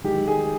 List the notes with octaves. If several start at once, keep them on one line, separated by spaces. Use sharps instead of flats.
D#3 G#3 D#4 G4
G#4